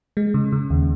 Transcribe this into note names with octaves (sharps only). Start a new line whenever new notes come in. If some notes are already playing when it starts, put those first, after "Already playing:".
G#3
C#3
C#3
D#2